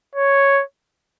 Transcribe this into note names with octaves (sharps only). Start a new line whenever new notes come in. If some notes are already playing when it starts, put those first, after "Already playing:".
C#5